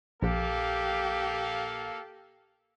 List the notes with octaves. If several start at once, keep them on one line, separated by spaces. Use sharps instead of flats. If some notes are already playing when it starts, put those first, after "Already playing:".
A#1 A#3 G4 A4 F5